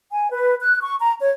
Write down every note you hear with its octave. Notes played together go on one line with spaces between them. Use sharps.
G#5
B4
F#6
C#6
A#5
C#5